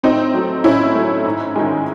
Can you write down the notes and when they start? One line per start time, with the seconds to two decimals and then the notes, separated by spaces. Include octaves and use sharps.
0.03 A2 C4 D#4
0.34 F#3 A3
0.64 A2 C#4 E4
0.95 F#3 A3
1.25 G#2
1.56 D#3 G#3